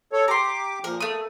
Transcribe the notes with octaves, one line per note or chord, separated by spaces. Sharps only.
A4 C#5
G4 A#5 C6 D6
A#2 F3 A#4
A3 A#3 D#6